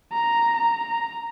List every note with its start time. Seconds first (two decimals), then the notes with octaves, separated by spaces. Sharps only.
0.12 A#5
0.56 A#5